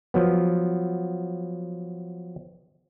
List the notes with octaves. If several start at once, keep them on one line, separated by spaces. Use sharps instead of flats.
F3 F#3 B3